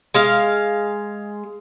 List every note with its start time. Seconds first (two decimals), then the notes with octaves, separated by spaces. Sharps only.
0.14 G#3 F5